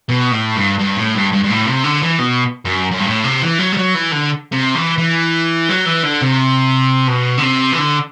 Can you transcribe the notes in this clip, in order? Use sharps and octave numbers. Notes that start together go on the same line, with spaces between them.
B2
A2
G2
G2
A2
G2
G2
G2
A2
C3
D3
E3
B2
F#2
F#2
G2
A2
C3
E3
F#3
G3
F#3
E3
D3
C3
E3
E3
F#3
E3
D3
C3
B2
D3
C3
E3
D3